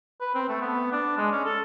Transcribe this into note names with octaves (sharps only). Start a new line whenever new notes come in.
B4
C4
A3
B3
D4
G#3
C#4
A4